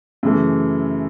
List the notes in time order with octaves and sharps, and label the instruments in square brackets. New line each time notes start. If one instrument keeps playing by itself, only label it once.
[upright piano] F#2 C#3 E3 A3